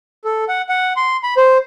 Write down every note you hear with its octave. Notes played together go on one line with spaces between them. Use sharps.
A4
F#5
F#5
C6
B5
C5